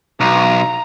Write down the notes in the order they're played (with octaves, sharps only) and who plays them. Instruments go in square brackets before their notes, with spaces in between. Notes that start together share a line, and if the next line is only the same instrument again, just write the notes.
[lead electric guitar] B1 [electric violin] A#5